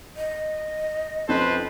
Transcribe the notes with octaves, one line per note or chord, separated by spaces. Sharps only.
D#5
F2 C#4 A4 B4 C5